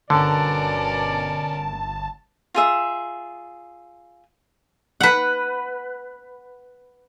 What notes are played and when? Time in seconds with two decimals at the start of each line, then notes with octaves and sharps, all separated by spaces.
0.10 G1 B2 D3 C#4 A#4 D5 A5
2.55 F4 G#4 E5
5.00 B4 F#5